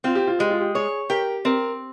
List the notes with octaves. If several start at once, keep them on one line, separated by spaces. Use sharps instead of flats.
C4 F4
G4
F4
G#3 G4
F4
G4
G#4 C#5
G4 A#4
C4 A#4